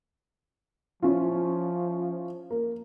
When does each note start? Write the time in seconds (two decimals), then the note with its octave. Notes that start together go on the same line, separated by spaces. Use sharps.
1.03 F3 C#4 E4 F4
2.51 A#3